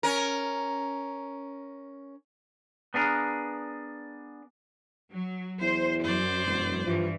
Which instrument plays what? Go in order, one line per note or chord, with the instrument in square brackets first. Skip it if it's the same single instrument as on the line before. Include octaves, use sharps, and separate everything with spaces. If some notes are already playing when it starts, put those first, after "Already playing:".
[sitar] C#4 A#4
[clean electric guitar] B3 D4 G#4 A#4
[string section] F#3
[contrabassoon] E2 [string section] C5
[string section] F#2 [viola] C5 D5
[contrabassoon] E1
[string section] G2 E3 [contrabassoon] F3